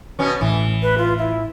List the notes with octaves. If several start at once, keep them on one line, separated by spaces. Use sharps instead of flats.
B2 B3 C#4
A1 A2 E3
B4
F4
E4